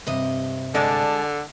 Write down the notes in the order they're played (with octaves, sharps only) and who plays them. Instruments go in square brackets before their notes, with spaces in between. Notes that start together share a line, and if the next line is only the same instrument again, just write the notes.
[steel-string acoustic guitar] G2 C3 D#5
[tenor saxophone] D3 [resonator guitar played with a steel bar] G#3 D5 [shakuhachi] A5